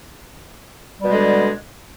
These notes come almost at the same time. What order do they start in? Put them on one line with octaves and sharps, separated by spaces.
G3 B2 G#3 D3